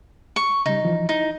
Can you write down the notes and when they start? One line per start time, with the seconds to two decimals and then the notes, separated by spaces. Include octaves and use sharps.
0.36 C#6
0.66 C#3 G3 D#4
0.84 E3 F3
1.09 D#4 E4